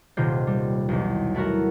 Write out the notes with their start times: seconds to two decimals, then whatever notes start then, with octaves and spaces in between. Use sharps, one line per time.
0.17 D#1 C3 F4 G6
0.47 G3
0.89 B1 E2
1.35 A3 E4 F#4 A#4